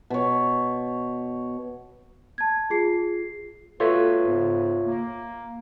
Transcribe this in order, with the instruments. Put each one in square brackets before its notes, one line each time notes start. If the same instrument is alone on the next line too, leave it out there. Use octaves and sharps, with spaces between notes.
[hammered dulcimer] B2 C#5
[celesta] A5 G#6
F4 G#4 C7
[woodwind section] A#3 F#4 B4 [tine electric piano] F4 C#5 E5 [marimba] A4
[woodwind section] G#2 C#3 B3
A#3